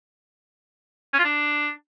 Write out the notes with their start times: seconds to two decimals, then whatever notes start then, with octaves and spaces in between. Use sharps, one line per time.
1.14 C#4
1.19 F4
1.24 D4